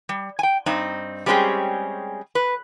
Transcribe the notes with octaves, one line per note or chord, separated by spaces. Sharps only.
G3
G5 G#5
G2 C4 D#4
G3 G#3 C4 C#4 G4 G#4
B4